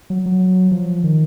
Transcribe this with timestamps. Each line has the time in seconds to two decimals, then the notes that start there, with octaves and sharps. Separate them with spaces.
0.10 F#3
0.26 F#3
0.71 F3
1.04 D#3